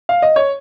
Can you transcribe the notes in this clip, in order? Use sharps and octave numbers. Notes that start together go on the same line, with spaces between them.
F5
D#5
C#5